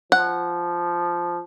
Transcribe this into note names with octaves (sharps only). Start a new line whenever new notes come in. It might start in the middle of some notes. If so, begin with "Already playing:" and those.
F3 F#5